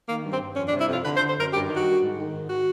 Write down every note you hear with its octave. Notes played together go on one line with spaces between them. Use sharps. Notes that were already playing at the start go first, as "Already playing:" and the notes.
D#3 A#3
G2
C4
G2
F2 C#4
D4
C3
E4
F2 F4
D3 B4
C5
D3
C5
F#2 A#4
G2 G4
D#3
F#4
G2
G#2
D#3
G#2
F#4